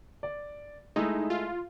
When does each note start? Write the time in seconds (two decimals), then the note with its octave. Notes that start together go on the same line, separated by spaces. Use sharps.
0.23 D5
0.96 G#3 A3 D#4 E4
1.30 F4